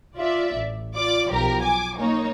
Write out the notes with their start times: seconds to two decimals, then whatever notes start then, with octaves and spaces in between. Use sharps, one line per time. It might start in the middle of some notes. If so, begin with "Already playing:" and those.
0.16 F4 D5 E5
0.57 A1
0.95 F4 D5 D6
1.30 B1 F3 G4 A#4
1.62 G#5 D6
1.97 A#3 D#4 C#5